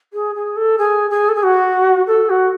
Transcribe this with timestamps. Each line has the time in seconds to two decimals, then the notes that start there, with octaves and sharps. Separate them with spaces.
0.13 G#4
0.35 G#4
0.56 A4
0.78 G#4
1.10 G#4
1.28 A4
1.35 G#4
1.43 F#4
2.07 A4
2.29 F#4